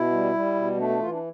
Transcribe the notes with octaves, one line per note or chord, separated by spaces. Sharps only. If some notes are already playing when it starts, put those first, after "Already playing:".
Already playing: B2 E4
G3
G3
B2
A3 D4
D4
E3 F4
D4